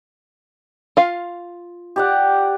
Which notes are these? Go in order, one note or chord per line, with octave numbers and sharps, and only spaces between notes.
F4 F5
G4 D5 F#5